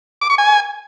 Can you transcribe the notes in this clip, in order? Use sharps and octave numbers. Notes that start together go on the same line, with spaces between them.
D6
C#6
G#5